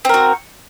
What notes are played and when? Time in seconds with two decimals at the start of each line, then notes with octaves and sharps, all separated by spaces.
0.05 C4
0.09 A#4
0.14 F#4